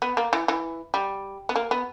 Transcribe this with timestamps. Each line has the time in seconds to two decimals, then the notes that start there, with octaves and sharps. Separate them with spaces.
0.02 B3
0.17 A#3
0.33 E3
0.48 E3
0.94 G3
1.49 B3
1.56 A#3
1.71 B3